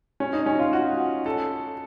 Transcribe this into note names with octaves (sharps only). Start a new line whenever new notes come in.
C#4
D#4
C#4
F4
F#4
A4